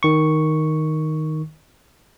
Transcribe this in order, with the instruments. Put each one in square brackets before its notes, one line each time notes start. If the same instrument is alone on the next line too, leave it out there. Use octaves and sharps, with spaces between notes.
[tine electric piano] D#3 C#6